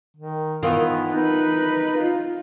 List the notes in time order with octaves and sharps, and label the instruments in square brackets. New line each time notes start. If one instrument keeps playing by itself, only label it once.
[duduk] D#3
[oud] D#3 E3 F4 [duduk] B3
[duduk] D#4 [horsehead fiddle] B4
[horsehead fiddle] F4